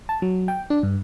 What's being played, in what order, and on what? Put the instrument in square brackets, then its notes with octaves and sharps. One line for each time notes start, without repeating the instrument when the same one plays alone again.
[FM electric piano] A5
F#3
G5
D4
G2